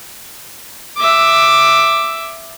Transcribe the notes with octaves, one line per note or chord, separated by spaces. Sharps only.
E5 D6